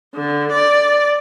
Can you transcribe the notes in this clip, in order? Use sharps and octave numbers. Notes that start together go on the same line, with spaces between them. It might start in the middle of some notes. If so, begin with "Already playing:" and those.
D3
D5